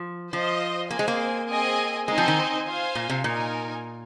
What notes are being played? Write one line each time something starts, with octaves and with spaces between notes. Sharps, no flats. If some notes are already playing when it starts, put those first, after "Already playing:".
Already playing: F3
F3 F4 C5 D#5
A#3 C4 G#4 C5 G#5
G#3
A#3
C4 G#4 D#5 G#5
G#3 C4 D#4 C5 D#5 G#5
F3
D#3
F4 C5 F5 G#5
A#2
C3
A#2 D#4 A#4 G#5